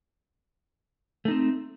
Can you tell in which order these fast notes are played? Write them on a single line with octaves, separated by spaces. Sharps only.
A3 D#4 C4